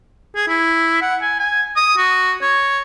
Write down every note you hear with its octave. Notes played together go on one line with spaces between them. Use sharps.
G#4
E4
F#5
G#5
G#5
D#6
F#4
C#5